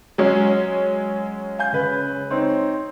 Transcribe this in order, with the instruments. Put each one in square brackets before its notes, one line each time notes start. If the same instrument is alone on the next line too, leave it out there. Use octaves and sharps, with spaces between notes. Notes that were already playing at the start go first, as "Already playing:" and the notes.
[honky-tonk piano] F#3 G#3 C#4
[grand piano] F5 G#5 G6
C#3 B4
C4 D#4 C#5